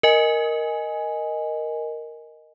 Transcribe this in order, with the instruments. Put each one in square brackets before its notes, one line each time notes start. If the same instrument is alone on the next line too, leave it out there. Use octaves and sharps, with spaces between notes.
[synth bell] A#4 D#5 G#5